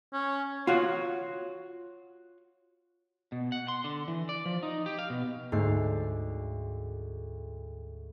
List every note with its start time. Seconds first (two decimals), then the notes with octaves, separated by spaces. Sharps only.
0.13 C#4
0.67 F4 F#4 C#5
3.32 B2
3.52 F#5
3.68 C6
3.84 D3
4.08 E3
4.29 D5
4.46 F3
4.63 D#4
4.86 G4
4.98 F5
5.10 B2
5.52 D2 G#2 A3 C7